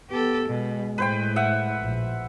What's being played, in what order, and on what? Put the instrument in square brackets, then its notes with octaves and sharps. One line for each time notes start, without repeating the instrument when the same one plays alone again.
[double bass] B3 [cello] G4 A4
[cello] B2 [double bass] G#3
[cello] A2 [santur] B4 C5 G5
[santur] E5 F#5
[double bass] A#1